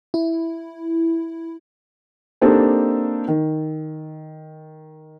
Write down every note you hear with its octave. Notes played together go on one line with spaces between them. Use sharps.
E4
A#3 C4 D4 D#4 G4 A4
D#3